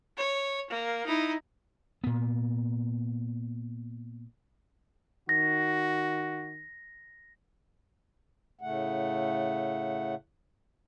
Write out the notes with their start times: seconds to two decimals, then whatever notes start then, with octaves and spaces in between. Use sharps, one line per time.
0.17 C#5
0.70 A#3
1.06 D#4 E4
2.04 A#2 B3
5.29 D#3 F#4 A#6
8.61 A2 C#3 A3 F#5